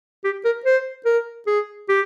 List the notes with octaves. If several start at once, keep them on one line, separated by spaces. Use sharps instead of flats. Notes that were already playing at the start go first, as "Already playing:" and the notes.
G4
A#4
C5
A#4
G#4
G4